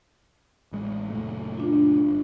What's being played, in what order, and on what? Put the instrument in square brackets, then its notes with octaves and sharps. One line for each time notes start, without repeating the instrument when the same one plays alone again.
[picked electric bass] A1 G#3
F#1 A#2 A3
[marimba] D4 F4
[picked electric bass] G1